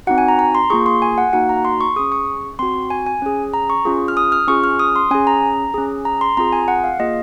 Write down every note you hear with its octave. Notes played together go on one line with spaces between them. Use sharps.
C4 D#4 F#4 F#5
G#5
A#5
A#5
C6
A#3 F4 G#4 C#6
C6
G#5
F#5
A#3 D#4 F#4 F#5
A#5
C6
C#6
C#4 G#4 D#6
C#6
C4 F#4 C6
G#5
G#5
C#4 G#4
A#5
C#6
C#4 F4 G#4
F6
D#6
F6
C#4 F4 G#4 C#6
F6
D#6
C6
C#4 G#4 G#5
A#5
C#4 G#4
A#5
C6
C4 F4 G#4 A#5
G#5
F#5
F5
A#3 F4 G#4 D#5